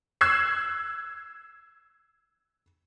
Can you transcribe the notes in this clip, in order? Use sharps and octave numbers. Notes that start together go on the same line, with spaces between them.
E6 F#6 G#6 C7